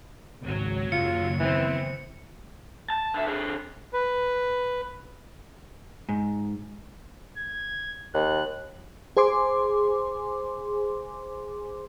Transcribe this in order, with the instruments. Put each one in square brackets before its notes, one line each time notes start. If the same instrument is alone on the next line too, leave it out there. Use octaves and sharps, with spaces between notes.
[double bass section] G#1 C#2 [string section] F#3
[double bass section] F#1 D#2 C#3 [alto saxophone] F4 [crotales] C#7
[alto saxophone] E3 [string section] B3 C4
[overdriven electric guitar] A5
D3 E5
D3 G#4
[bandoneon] B4
[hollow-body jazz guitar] G#2
[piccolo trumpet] G#6
[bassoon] D#2 [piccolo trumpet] F#6
[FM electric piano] G#4 C5 G#5 C6 D6